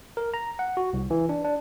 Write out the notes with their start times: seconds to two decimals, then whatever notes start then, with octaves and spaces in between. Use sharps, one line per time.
0.17 A#4
0.34 A#5
0.59 F#5
0.77 F#4
0.93 C2
1.11 E3
1.29 D4
1.45 D4